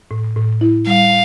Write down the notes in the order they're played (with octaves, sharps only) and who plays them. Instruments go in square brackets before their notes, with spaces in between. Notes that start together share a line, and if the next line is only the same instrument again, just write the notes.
[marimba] A2
A2
E4
[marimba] G3 [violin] F5